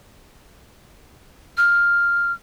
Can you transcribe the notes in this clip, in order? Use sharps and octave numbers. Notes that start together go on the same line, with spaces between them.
F6